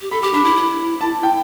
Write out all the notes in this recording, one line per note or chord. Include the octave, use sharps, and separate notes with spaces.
G4
A4 B5
G4 D6
D4 B5
E4 B5
E4
A5
G5